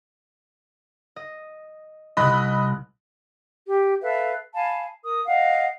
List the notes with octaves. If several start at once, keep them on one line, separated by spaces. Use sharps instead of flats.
D#5
C2 C3 D#5 B5 F#6
G4
A4 B4 E5 F5
F5 G#5 A5 B5
A#4 D#6
D#5 F5 F#5